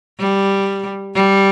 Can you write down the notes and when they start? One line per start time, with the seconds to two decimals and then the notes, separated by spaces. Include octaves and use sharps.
0.20 G3
1.15 G3